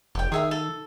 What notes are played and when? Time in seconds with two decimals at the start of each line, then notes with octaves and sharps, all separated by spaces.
0.15 F1 G4 G5
0.32 D#3 G#4 E5 F5
0.51 A4